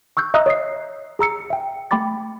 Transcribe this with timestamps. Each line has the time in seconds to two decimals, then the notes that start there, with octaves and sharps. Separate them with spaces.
0.17 C#6 E6 F#6 G6
0.34 D#5 E5 A#5 D#6 E6 F#6
0.46 C#5 D#5 D#6 C7
1.19 G#4 A#5 E6 C#7
1.50 E5 G5
1.91 A3 G5 B5 D6 A6